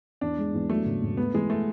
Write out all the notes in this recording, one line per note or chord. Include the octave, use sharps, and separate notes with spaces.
E2 D4
G#3
E2
F#3 A3
C#3
E1
A3 B3
E3 G#3
A3